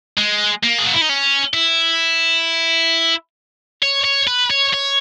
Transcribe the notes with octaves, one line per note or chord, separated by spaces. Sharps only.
G#3
A#3
G#4
F#4
E4
D#4
C#4
E4
C#5
C#5
B4
C#5
C#5